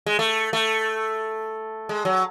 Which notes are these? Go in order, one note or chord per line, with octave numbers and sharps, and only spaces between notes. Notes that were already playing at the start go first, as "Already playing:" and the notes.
G#3
A3
A3
G#3
F#3